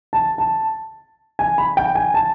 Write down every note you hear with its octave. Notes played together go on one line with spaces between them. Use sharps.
A5
A5
G#5
B5
G5
G#5
A5